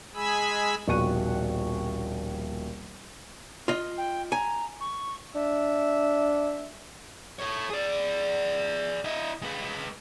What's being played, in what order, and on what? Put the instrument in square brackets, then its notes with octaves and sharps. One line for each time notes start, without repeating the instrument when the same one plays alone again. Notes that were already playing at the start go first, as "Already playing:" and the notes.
[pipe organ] G#3 G#4 G#5 B5 E6
[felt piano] D#1 A#1 B2 C#6 F#6 D#7
[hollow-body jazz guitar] F4 D#5
[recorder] G5
[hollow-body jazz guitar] G#5 [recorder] A#5
[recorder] C#6
[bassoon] D4 [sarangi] E5
[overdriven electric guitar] A4 C#5
G#4 D5
E4 D#5
G#3 B4